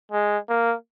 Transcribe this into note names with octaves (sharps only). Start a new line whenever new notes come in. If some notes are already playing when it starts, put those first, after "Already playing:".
G#3
A#3